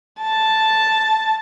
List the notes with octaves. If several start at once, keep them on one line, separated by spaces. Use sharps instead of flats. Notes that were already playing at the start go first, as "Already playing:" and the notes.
A5